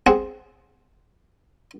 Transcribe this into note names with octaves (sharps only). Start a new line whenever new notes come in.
C4 G#4 F#5